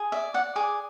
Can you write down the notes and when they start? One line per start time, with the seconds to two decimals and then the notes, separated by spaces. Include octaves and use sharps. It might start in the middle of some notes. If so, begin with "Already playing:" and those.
Already playing: G#4
0.12 D5 E5
0.34 D5 F#5
0.56 G#4 D6